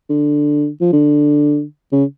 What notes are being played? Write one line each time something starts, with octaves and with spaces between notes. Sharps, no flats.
D3
F3
D3
C#3